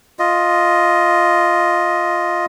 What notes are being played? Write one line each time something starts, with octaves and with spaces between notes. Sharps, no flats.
F4 D#5